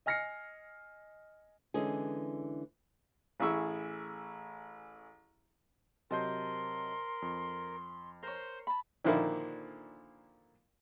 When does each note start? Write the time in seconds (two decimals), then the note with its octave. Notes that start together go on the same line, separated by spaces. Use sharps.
0.06 D#5 G#5 F6 A#6 C7 C#7
1.74 D3 E3 G#3 C#4 G#4
3.40 A1 E4 G#4 C#6 E6
6.11 C3 F#3 A#4 C5 D#5 A5 C6
7.22 F2
8.23 A#4 C5 C#5 C6
8.67 A5 B5
9.05 A#2 D3 D#3 F3 A#3 E4